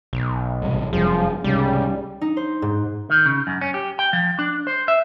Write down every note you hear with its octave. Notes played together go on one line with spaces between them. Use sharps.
B1
A1 G2 C3
F1 F#2 F3 G3 G#4
C2 G#2 C#3 G3
D#4
C5
G#2
D#3
C#3
F#2
C#4
G4
G5
F3
D4
C5
E5